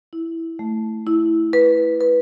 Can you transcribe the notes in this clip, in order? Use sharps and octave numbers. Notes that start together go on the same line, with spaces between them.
E4
A3
E4
B4
B4